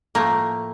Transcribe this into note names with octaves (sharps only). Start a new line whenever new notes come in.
A2 F3 A3 A#3